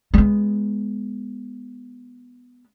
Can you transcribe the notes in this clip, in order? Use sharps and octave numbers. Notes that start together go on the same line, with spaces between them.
G#3 B3